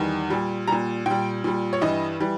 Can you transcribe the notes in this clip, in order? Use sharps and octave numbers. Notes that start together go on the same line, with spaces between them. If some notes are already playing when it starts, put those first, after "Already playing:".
Already playing: E2 D#3 G3
A#2 G3
A#2 G3 A#5
A#2 G3 G5
A#2 G3
C#5
G2 E3 G3 D#5
E3 G3